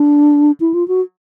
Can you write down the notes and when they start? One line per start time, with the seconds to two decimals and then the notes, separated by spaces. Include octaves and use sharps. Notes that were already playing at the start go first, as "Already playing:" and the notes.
Already playing: D4
0.60 E4
0.74 F4
0.88 F#4